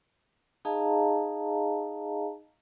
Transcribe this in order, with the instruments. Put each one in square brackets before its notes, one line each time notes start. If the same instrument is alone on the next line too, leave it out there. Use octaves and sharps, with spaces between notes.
[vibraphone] D#4 G#4 D#5 F5 A5 A#5